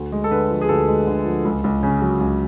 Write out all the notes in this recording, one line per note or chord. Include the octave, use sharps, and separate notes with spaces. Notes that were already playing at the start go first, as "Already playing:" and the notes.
Already playing: D2
G#3
A4
D3 B4
F3
G#4
D2 A4
G#3
D3
F3
C#2
C#2
C#3
F#3
C#2